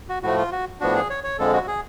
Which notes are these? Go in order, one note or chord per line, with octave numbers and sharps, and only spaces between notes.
F#4
A2 F3 A3 F#4
F4
F#4
A2 F3 B3 D4 F#4
G#4
C#5
C#5
F2 D3 F3 G#3 A4
F#4
G#4